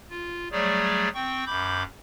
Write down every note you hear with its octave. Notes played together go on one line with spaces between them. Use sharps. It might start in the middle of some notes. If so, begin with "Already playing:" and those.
F4
F#3 G3 A3 G#4 C#5 D5
C4 G5 C#6
F#2 B5 D6 G6